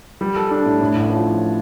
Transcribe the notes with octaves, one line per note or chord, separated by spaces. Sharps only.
G3
A4
D4
A2
A2
A1
F3